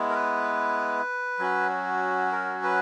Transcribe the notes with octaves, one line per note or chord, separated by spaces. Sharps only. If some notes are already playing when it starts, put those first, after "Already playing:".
Already playing: G#3 B3 E4
A#4
B4
F#3 C#4 F#4
A#4
B4